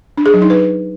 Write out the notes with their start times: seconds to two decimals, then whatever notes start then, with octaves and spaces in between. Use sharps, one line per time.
0.18 D4
0.26 G#4
0.34 F#3
0.42 D#4
0.50 B4